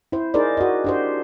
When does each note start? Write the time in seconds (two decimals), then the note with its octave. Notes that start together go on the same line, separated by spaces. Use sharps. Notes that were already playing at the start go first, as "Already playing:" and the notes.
0.12 E4 C5
0.34 D#4 G#4 A#4 C5 D5
0.57 F#4 D#5
0.84 D4 G4 C5